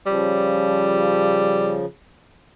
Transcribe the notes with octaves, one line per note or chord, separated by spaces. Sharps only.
C#3 F3 G3